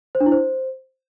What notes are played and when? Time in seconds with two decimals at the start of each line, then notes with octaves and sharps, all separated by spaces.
0.15 C5
0.20 D4
0.26 E4
0.32 C5